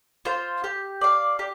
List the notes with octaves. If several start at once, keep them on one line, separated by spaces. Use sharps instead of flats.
F4 C5
G4
D5 F5
G4